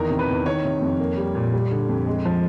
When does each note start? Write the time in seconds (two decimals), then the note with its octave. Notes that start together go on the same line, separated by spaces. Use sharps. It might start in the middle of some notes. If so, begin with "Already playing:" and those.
Already playing: E2 D#3 A#4
0.10 C3
0.19 B4
0.29 E2
0.46 D#3 C#5
0.64 C3
0.81 F2
1.00 A#3
1.17 G3
1.35 A#2
1.53 G3
1.71 D3
1.89 F2
2.07 G#3
2.25 F3